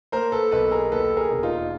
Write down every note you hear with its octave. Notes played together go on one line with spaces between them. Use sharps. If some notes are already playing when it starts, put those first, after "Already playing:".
A#3 A#4 C5
A4 B4
B1 A4 B4
G#4 A#4
D#2 A4 B4
G#4 A#4
E1
D#4 F4